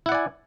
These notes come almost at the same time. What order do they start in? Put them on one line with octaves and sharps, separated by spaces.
E4 F#5 D5 G#5